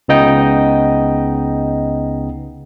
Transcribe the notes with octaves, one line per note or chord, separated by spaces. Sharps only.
C#2 C#3 B3 D#4 D#5 G5